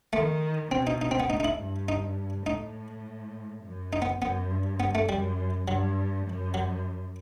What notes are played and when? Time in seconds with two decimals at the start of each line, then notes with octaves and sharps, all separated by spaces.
0.13 D#3 A3
0.71 B2 C4
0.87 D#4
1.02 D#4
1.11 C4
1.20 B3
1.30 A2 D#4
1.40 D#4
1.45 E4
1.60 G2
1.89 D#4
2.46 A2 D#4
3.63 F#2
3.93 D#4
4.02 B3
4.21 F#2 B3
4.51 G2
4.80 B3
4.95 A3
5.09 F#2 G3
5.67 G2 F#3
6.26 F#2
6.54 F#3